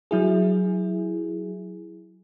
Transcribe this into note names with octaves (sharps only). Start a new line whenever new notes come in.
F#3 E4 G#4